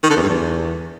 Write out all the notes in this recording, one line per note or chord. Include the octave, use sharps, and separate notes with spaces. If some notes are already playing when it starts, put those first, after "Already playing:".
D#3
D3
E2
G2
E2